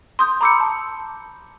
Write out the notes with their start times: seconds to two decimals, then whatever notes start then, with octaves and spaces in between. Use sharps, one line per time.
0.19 C6 D#6 G6
0.41 A#5 B5 D6 E6 G6 C#7
0.60 A5